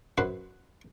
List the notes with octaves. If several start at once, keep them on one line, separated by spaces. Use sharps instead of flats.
F#2 B4 C5 F#5